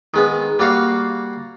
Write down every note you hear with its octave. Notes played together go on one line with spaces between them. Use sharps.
D#3 G#3 B3
G3 A#3 F#4 F5